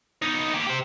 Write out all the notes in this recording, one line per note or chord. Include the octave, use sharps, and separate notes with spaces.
B3 D#4
A#3 G4
G4 C5